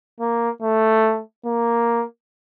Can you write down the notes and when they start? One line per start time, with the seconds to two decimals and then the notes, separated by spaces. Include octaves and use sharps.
0.20 A#3
0.62 A3
1.46 A#3